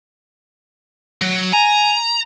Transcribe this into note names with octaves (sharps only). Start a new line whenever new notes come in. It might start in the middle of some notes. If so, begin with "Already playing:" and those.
F#3
G#5 A#5